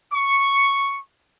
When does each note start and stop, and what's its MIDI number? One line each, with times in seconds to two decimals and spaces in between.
0.13 0.99 85